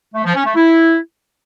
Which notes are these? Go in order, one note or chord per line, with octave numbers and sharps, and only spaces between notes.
A3
F3
C#4
A3
E4